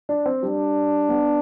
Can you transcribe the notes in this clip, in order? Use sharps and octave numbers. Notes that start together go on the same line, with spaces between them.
D4
C4
G3 D4
B3